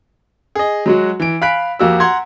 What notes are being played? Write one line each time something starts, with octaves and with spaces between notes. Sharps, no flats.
G#4 D#5
F#3 G#3 F#4
E3 D7
F5 G#5 B5 F#6 B6 D7
F2 A#3 F#4 G4 E6
F#5 A#5 C6 G#6